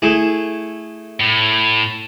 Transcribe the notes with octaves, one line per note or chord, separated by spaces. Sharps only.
A3 E4 G#4
A2